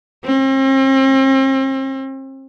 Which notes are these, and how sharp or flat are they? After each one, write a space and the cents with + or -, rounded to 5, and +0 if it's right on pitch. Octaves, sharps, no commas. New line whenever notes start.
C4 +40